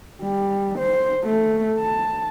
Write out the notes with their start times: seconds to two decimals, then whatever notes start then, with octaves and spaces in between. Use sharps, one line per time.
0.22 G3
0.79 C5
1.25 A3
1.80 A5